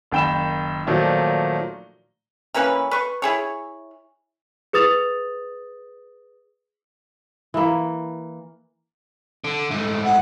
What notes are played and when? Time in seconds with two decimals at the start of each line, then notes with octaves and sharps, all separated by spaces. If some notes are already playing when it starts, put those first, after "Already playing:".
0.12 F#1 D#3 G5 B5 E7
0.87 A#2 D#3 F3 F#3 A3 D4
2.54 E3 A#3 C#4 B4
2.91 B4 C#6
3.22 E4 G#4 C#5
4.73 G#4 B4 D#6 A6 F7
7.54 E3 A#3
9.44 D3
9.71 G#2 A3
10.04 F#5